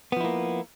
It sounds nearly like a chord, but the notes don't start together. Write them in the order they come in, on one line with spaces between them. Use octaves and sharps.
B3 F3 E4 A#3